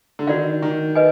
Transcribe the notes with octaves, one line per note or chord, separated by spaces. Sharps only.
D3
D#3 F#4 D5 F5
D#3
B4 D#5 G#5